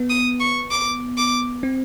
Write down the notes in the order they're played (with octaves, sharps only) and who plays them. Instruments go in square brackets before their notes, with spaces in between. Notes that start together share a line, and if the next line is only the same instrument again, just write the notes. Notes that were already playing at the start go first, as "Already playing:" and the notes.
Already playing: [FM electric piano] B3
[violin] D#6
C#6
D6
D6
[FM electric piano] C4